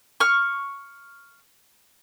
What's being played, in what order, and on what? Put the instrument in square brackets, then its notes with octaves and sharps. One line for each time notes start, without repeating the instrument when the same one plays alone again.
[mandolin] C#6 F6